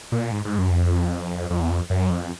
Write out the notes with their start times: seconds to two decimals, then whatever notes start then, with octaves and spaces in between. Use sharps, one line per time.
0.12 A#2
0.31 G#2
0.45 G#2
0.58 F#2
0.71 F2
1.50 F2
1.60 E2
1.70 F2
1.90 F#2
2.10 F2